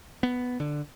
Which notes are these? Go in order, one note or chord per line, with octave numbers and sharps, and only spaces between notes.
B3
D3